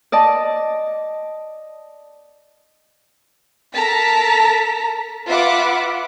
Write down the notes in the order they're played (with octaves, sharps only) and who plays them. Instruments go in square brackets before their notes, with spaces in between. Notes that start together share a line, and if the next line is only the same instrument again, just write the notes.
[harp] D5 D#5 A5
[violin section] A4 A#4 A5 A#5 B6
F4 B4 E5 F#5 B5 D6